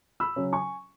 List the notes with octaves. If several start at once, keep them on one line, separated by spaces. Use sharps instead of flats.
B5 E6
C#3 F#3 C#4
G#5 C#6